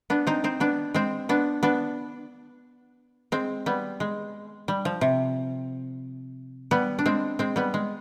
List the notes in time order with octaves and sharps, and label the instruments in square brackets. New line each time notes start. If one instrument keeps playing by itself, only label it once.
[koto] B3 D4
C4 D#4
C4 D#4
B3 D4
G#3 C4
B3 D4
B3 D4
G#3 C4
G3 B3
G#3
G3
F3
C3
G3 B3
D4
G#3 C4
G#3 C4
G3 B3
G#3